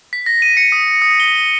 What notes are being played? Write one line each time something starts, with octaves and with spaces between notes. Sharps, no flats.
B6
A#6
D#7
C#7
D#6
D#6
G7